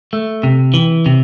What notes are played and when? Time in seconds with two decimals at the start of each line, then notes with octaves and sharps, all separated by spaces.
0.13 A3
0.43 C3
0.74 E3
1.06 C3